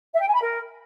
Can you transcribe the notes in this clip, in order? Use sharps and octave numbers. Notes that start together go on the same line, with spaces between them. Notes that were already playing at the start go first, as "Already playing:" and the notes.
E5
G5
G#5
B5
A#4